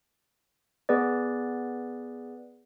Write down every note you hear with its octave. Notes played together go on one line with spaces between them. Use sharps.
B3 G#4 B4 D5